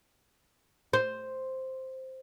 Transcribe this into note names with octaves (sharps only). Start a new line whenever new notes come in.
C5